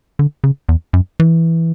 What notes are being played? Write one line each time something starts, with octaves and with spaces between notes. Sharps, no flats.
D3
C#3
E2
F#2
E3